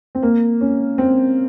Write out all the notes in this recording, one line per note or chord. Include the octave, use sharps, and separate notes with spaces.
C4
A#3
C#4
C4